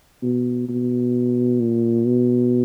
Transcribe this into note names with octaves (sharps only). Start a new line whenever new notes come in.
B2
B2
A#2
B2